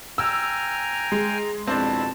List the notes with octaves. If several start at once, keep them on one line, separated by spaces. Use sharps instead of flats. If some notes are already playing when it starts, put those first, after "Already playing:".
G5 G#5 A#5 E6 F6
G#3
F2 B2 C4 D4 E4 C5 A5